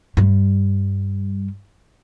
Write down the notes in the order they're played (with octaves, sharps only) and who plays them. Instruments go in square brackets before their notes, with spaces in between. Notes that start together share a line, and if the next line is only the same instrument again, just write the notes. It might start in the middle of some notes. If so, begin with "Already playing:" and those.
[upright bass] G2 G3